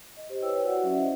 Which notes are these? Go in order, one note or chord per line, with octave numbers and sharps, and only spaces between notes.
D#5
G4 C5
E4 G4 B4 C#5 G5 E6
F#4 D5 F#5
F#3 C#4 E5 F#5
E4 C5 D5 D#5